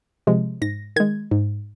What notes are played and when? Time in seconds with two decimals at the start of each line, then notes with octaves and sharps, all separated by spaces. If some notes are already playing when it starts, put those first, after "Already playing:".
0.27 C3 F3 G#3
0.62 G#2 A#6
0.96 D#3 G#3 G#6
1.31 G#2